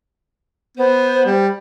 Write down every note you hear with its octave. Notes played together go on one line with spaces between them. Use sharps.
B3 C5
G3